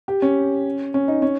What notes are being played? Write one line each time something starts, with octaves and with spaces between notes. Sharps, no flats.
G4
C#4
C#4
D#4
C#4